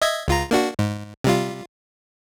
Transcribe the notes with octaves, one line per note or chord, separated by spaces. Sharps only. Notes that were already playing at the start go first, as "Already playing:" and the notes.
D#5 E5 G#6
C#2 F4 A#5
A#3 D4 F#4
G#2
C3 G3 F4